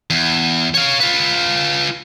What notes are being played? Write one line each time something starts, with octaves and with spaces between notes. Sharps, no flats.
E2
C#5 F5
F4 B4